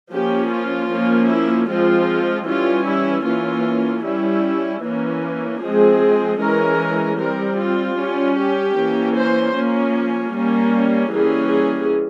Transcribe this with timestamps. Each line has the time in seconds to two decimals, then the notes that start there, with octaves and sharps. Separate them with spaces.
0.11 F3 A#3 C#4 G4
0.50 F4
0.90 F3 A#3 C#4
1.29 E4
1.68 F3 G#3 C4 F4
2.47 E3 G3 C#4 F4
2.86 E4
3.26 E3 A#3 C#4 F4
4.04 G3 C#4 E4
4.83 E3 A#3 C#4
5.61 F3 G#3 C4 G#4
6.41 E3 G#3 C#4 A#4
7.19 G3 C4 A#4
7.58 F4
7.98 G3 C#4
8.37 G4
8.76 E3 A#3 C#4
9.16 C5
9.55 F3 A#3 C#4
10.34 G3 A#3 C#4
11.13 E3 G3 A#3 C#4 G#4
11.52 G#4